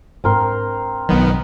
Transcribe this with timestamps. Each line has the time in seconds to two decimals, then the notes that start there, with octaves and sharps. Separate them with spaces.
0.24 G#2 C4 D4 A#4 C6
1.09 B1 D#3 F#3 B3